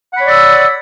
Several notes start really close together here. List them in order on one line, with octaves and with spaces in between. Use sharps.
F#5 B5 C#5 D5 E6